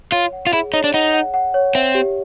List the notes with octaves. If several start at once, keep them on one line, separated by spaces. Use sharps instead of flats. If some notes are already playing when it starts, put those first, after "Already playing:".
F4 C#5
F#5
F4
E4 G#4
D#4 C#5
D4
D#4 F#5
F#5
F#5
C#5
C4 E5
G4